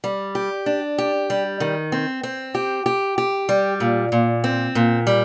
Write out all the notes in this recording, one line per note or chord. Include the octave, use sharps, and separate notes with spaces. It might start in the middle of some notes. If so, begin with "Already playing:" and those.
G3
G4
D4
G4
G3
D#3
C4
C4
G4
G4
G4
G3
A#2
A#2
C4
A#2
G3